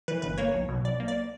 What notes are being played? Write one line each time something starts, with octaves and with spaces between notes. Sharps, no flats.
E3 B4
G1 B4
A#3 C#5
B1
B2
B1 D5
A#3
D5